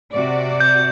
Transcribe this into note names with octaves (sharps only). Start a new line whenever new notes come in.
C3 F#4 D5
G6